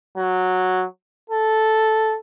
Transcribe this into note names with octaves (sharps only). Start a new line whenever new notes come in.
F#3
A4